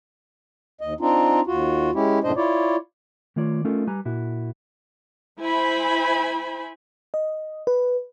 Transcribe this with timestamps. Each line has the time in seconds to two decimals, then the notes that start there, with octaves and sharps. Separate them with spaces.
0.81 D#2 D#5
1.01 C4 D4 D#4 F4
1.47 D#2 F4 F#4
1.95 G#3 C#4 E4 G4
2.24 F#2 A2 C3 D4 C5 D#5
2.36 E4 F4 C#5 D5
3.36 D#3 A3 F4 C#5 D5
3.65 A3 C#4 D#4 F4 A4 A#4
3.87 G3 B4 G#5 A#5
4.05 A#2 E4 F#4
5.40 E4 C5 G#5 B5
7.14 D#5
7.67 B4